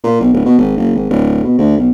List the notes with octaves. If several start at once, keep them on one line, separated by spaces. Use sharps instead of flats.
A#2
B1
D1
B2
G#1
F#1
G#1
D1
B2
D2
B1